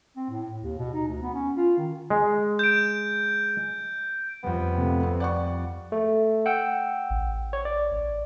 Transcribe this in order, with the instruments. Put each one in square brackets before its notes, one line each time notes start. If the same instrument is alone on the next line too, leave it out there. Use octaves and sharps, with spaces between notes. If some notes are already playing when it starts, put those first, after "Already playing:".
[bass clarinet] C4
A2
D#2
B2
D#4
D2
B3
C#4
F4
D#3
[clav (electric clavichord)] G#3
[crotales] G6 D7
[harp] F2 G3 [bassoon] B3
[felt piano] C3 A3
C4
D5 F#5 C#6
[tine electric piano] A3
F#5 G5 E6
[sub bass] A1
[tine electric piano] C#5
D5